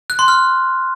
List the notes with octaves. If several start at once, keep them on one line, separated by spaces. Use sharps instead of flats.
F#6
C6
F6